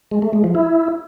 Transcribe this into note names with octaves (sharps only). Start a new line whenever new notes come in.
G#3
A3
G#3
F3
E4